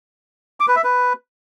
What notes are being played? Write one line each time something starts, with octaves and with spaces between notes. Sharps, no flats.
D6
B4
E5
B4